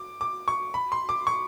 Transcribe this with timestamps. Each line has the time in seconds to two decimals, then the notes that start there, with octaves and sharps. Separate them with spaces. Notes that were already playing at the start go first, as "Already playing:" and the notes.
Already playing: D6
0.21 D6
0.48 C#6
0.74 B5
0.92 C6
1.09 D6
1.27 C#6